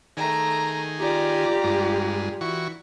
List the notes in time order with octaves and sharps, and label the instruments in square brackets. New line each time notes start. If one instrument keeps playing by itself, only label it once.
[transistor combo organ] D#3 G#4 [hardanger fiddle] A3 A#5
[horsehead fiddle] F4 G4 [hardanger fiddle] D5 A#5
[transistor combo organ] G2 G#3
E3 F#4 C#6